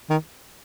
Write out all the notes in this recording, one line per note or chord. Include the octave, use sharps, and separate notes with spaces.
D#3